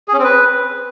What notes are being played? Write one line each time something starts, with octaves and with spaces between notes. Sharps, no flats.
G#4
C#4
C4
B4